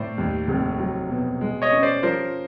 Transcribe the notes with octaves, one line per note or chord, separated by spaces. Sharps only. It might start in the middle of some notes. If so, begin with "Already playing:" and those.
Already playing: A2 C5 D5
D#2
F1
F#3
B2
G#3
C#5 D#5
C#4
C5 D5
F3 A#4 C5